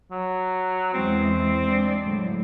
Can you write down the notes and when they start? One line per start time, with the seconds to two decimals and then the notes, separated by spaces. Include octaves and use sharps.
0.11 F#3
0.93 E2 E3 G#3 C4
1.66 G#3 D4 D5
2.03 A2 D3 F#3